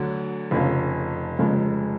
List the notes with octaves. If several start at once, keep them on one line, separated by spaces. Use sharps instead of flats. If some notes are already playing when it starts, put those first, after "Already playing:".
Already playing: D2 D3 F#3
F1 F2 C#3
F1 F2 C#3 G#3